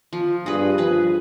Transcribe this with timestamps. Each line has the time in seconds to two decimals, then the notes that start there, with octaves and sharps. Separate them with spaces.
0.13 F3
0.46 G2 G#4 B4
0.78 F3 G#4 B4